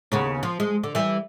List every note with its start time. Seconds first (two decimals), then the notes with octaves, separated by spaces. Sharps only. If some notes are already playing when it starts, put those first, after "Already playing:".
0.12 D#2 C#3 B3
0.43 F3
0.60 G#3
0.83 D3
0.95 E3 G3